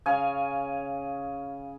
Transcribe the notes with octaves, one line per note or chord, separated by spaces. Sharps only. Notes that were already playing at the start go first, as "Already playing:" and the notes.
C#3 C#5 F5 G#5